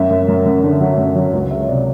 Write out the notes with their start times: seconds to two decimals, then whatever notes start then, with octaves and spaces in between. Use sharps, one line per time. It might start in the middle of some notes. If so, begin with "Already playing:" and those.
Already playing: F#2 E5
0.10 F#2
0.28 F#2
0.46 F#2
0.64 D3
0.81 F#3
0.98 F#2
1.16 F#3
1.33 C#2
1.51 G#3 E5
1.60 C#5
1.68 C3 D5